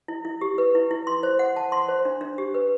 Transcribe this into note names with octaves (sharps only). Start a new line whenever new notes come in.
E4
E4
G4
B4
E4
E4
C6
C5
F#5
A5
C6
C5
D4
D4
G4
B4